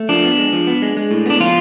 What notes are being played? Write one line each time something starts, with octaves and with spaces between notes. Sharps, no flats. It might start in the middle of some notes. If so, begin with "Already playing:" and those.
Already playing: A3
F3 D4
B3
G#3
F3
B3
G#3
G#3
A2
B3 D4
F3 F4